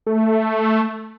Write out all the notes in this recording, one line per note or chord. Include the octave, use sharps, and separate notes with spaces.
A3